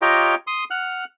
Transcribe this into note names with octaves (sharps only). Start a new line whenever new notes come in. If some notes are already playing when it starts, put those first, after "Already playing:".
F4 G4 C#5 D#5 G5 A#5
C6 D#6
F#5 F6 F#6